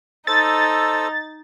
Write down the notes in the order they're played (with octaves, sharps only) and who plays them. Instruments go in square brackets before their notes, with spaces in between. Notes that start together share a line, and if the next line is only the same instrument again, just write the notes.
[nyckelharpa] D#4 [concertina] A4 C5 E6 [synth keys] A6